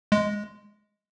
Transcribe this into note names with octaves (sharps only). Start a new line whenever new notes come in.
G#3